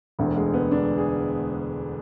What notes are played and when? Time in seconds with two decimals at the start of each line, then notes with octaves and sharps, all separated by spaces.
0.19 E1 D2 D3
0.36 G#3
0.54 B3
0.71 D4
0.98 G#4